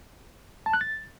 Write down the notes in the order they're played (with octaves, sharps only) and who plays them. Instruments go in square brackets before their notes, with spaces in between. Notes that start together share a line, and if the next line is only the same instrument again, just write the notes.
[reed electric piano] A5
F#6
A6